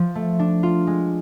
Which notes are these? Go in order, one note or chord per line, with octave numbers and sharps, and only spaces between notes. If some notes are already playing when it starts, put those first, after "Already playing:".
Already playing: F3
A3
D4
F4
G#3